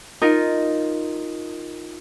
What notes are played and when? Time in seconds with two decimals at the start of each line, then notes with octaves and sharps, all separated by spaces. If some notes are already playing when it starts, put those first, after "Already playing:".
0.22 D#4 F4 A#4